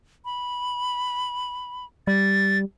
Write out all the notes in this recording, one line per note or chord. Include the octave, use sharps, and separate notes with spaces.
B5
G3 A6